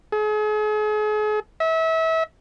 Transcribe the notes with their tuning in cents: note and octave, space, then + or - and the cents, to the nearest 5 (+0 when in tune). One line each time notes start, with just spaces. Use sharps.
G#4 +40
E5 -30